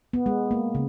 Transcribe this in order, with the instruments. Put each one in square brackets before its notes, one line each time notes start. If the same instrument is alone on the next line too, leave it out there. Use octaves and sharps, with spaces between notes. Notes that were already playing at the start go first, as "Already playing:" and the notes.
[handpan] B3
G#3
A#3
C#3